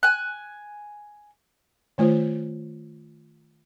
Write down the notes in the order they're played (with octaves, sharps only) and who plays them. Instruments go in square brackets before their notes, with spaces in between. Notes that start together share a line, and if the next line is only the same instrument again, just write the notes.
[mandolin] G#5 F#6
[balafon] D#3 A3 F4 C5